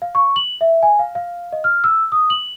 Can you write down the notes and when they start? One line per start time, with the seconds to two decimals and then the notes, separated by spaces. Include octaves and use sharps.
0.02 F5
0.15 C#6
0.36 F#7
0.61 E5
0.82 G#5
0.99 F5
1.15 F5
1.52 D#5
1.64 F6
1.84 E6
2.12 D#6
2.30 F#7